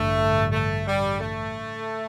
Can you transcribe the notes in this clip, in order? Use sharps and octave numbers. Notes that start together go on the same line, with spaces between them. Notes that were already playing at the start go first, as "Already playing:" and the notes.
Already playing: A1 G2 D3 A3
A3
G3
A3